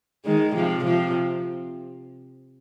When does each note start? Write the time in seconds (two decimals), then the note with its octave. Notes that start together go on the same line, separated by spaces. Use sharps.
0.25 D#3 G#3
0.55 C3 F3
0.85 C3 F3